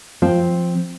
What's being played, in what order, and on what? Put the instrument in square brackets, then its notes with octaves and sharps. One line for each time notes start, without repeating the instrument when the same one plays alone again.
[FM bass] F3 [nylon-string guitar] C4